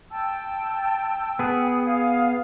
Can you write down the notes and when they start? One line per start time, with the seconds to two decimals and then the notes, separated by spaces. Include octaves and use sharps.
0.11 G5 A5 E6
1.39 B3 G#4
1.86 F5